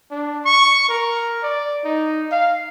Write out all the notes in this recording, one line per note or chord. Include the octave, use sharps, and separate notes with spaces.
D4
C#6
A#4
D5
D#4
F5